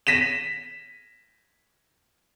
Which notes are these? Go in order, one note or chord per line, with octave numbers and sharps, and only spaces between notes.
A#6 B6 D#7 E7